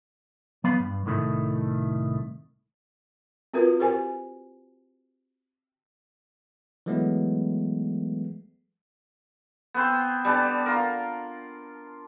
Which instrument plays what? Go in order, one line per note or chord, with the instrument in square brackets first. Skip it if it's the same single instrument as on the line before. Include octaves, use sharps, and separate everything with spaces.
[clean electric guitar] F#3 B3 F5 B5
G2
C2 A2 D#3 G#3 A3
[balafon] C4 F4 F#4 A#4 B4
G4 A#4 C5 G#5
[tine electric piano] E3 F#3 G#3 A3 B3
[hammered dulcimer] B3 C4 C5
G3 B3 D4 A5
F4 A#4